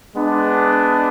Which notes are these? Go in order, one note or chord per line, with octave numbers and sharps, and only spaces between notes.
G#3 B3 D4